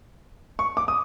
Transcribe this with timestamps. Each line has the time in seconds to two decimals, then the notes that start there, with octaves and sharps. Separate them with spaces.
0.59 C#6
0.77 D6
0.88 D#6